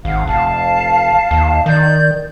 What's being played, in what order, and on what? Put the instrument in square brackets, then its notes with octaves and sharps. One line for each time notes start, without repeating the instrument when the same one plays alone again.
[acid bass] G#1 [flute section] F5 F#5
[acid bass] F1 [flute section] F5 A5
[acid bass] D#2
[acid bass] D#3 [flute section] D5 G6